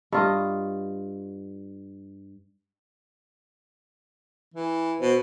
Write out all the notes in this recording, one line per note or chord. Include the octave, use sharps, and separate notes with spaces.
G2 F4 D#5
E3
B2 C5